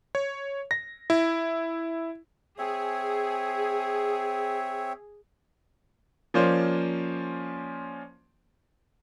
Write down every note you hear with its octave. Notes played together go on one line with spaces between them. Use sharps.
C#5
A#6
E4
C4 G#4 C#5 E5
F3 A#3 C#4 F4 C5 D5